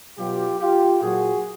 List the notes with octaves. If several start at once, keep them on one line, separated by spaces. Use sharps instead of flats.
B2 F#3 F4 G4
F4 G4
A#2 F#3 F#4 G#4